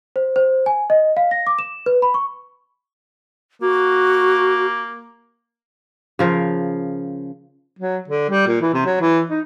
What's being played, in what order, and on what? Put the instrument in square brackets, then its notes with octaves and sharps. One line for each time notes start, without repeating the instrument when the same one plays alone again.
[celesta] C5
C5
G#5
D#5
F5
A#6
D6
E7
B4
B5
C#6
[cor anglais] A#3 [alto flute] F#4
[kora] C#3 F3 A#4
[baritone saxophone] F#3
D3
G3
A#2
E3
C3
F#3
E3
D#4